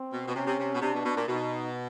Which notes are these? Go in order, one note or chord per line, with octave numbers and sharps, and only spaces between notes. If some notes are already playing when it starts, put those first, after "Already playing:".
Already playing: C4
B2
B2
C3 C#4
C3
C3
B2
C3 D4
B2
B2
A#2
B2 D#4